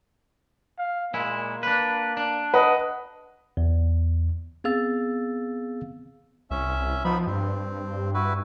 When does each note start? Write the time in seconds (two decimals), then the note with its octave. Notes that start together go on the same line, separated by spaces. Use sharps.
0.78 F5
1.14 A#2 G#3 A#3 E4
1.63 D4 B4
2.17 D4
2.54 B4 D#5 F#5
3.57 E2
4.64 B3 C4 G#4 F5 E6 A6
6.51 C2 C#4 E5
7.04 F3 B3 D#4 B5
7.27 G2 C4
8.14 E4 F#4 B4